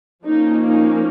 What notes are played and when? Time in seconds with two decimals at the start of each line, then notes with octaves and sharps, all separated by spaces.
0.25 F3 A#3 C#4 D#4
0.65 D#4